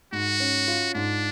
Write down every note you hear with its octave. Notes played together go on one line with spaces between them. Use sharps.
G#2 F#4
C#4
F4
G#2 D4